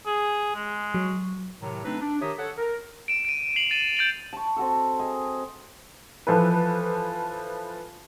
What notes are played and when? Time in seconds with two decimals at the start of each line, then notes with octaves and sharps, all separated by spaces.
0.06 G#4
0.55 G#3
0.94 F#3
1.61 A2 C3 D#3 F#3
1.85 A3 C4 D4 D#4 B4
2.01 D4
2.21 D#3 G4 C#5 E5 A#5 D#6
2.37 A4 C#5 F#5
2.57 A#4
3.08 D7 E7
3.25 D7 D#7
3.56 C7 F7 F#7
3.71 A6 D#7 E7 F#7
3.97 G6 A6 D7 F#7
4.33 A5 C#6
4.57 C4 F#4 A4
4.99 G#4 D#5
6.27 E3 F3 F4 A4 B4